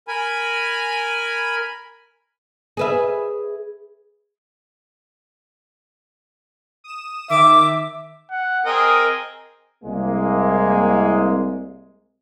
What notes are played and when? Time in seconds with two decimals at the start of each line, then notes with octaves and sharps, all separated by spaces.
0.08 A#4 G#5 B5
2.77 G#4 B4 E5
6.84 D#6 E7
7.30 D#3 E5 D6
8.31 F#5
8.66 C4 G#4 A#4 D#5
9.84 C2 G#3 A#3